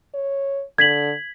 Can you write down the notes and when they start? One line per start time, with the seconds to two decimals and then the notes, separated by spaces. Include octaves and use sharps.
0.14 C#5
0.78 D3 G#6 B6 F#7